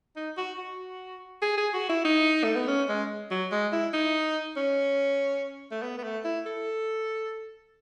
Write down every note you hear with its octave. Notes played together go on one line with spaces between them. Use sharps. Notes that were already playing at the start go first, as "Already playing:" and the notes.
D#4
F#4
F#4
G#4
G#4
F#4
E4
D#4
A3
B3
C#4
G#3
F#3
G#3
E4
D#4
C#4
A3
B3
B3
A3
E4
A4